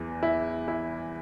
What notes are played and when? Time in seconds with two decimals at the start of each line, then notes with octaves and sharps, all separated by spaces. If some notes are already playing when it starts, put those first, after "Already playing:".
Already playing: E2 E3
0.23 E4
0.68 E4